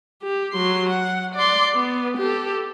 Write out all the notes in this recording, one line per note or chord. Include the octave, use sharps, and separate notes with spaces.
G4
F#3 C6
F#5
D5 C6
B3
G4 A4